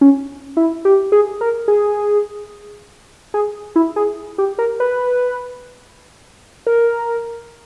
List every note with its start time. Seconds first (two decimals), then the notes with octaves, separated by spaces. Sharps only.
0.01 C#4
0.57 E4
0.85 G4
1.12 G#4
1.41 A#4
1.68 G#4
3.34 G#4
3.76 E4
3.96 G#4
4.38 G4
4.59 A#4
4.80 B4
6.67 A#4